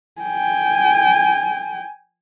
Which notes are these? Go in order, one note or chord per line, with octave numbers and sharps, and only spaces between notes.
G5 G#5